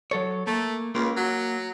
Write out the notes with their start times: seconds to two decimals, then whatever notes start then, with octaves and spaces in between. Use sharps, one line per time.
0.11 F#3 A4 C#5
0.47 A3 A#3
0.95 C#2 A#3
1.17 F#3